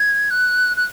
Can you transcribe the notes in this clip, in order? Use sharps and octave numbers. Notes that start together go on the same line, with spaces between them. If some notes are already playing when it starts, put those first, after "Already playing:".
Already playing: G#6
F#6
F#6